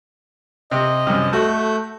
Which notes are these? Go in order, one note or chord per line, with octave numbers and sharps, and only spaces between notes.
C3 D#5
C2 F#2
A3 F#4 A4 G6